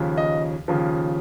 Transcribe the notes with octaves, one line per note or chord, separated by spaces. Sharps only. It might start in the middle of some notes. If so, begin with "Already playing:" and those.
Already playing: D#2 C#3 F3
D#5
D#2 C#3 F3